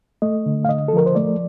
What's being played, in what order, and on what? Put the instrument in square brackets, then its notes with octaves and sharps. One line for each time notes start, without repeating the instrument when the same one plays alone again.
[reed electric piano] A3 D#5
D3
F5
D3 D#5
A4
F3 A#4
C5
A3 D5